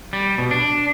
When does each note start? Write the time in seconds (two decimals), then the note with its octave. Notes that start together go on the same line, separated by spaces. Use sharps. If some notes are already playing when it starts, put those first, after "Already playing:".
0.13 G3
0.38 B2
0.51 D4